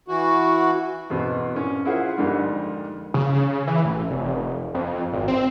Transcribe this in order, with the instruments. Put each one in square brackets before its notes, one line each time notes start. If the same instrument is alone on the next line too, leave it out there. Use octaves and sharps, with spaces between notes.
[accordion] E3 F#4
[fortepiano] E2 B2 C4
A#1 C#4
E4 F4 G#4 A#4 C5 F#5
F2 G#2 D3 G3 A#3
[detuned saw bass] C#3
E3
A1
F1
F2
G#1
C4